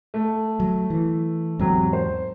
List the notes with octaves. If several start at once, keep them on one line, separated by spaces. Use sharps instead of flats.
A3
F#3
E3
E2 G#2 C3 F#3
C5